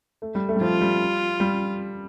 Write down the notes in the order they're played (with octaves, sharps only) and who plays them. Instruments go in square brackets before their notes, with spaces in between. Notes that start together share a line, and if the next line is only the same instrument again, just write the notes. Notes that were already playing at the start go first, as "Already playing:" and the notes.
[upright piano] A3
G3
A3
G3
[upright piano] F3 [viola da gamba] F4
[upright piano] G3
G3